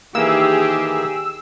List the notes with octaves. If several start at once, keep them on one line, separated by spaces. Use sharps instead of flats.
D#3 E3 A#3 G4 G#4 E6